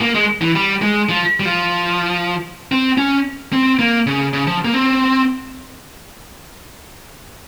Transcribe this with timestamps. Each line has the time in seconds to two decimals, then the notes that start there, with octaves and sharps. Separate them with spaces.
0.01 A#3
0.14 G#3
0.41 E3
0.55 G3
0.82 G#3
1.09 F3
1.40 G3
1.45 F3
2.72 C4
2.98 C#4
3.53 C4
3.79 A#3
4.06 C#3
4.33 C#3
4.47 F3
4.65 A#3
4.74 C4